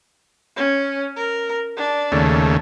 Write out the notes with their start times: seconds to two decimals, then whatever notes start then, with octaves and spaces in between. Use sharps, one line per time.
0.57 C#4
1.17 A#4
1.77 D4
2.12 D#2 C#3 A3